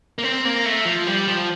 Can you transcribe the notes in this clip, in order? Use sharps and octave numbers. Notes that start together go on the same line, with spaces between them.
A#3
C4
A#3
A3
F3
G3
F3